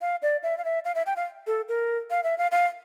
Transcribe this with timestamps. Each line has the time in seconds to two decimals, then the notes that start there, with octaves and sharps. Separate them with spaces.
0.01 F5
0.22 D5
0.43 E5
0.58 F5
0.65 E5
0.85 F5
0.95 E5
1.06 G5
1.16 F5
1.47 A4
1.68 A#4
2.10 F5
2.24 E5
2.38 F5
2.51 F5